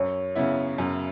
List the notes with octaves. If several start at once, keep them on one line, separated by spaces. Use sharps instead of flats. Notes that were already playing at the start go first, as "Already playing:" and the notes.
Already playing: F#2 C#5
C#3 F#3 B3 E4
F#2